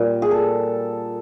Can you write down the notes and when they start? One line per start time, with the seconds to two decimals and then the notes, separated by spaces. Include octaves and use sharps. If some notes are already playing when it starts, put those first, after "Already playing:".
Already playing: A#2 G3
0.22 G#4
0.31 A4